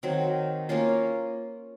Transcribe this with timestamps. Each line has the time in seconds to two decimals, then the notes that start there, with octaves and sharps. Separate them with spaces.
0.03 D#3 F#3 C4
0.69 A#3 C#4 F4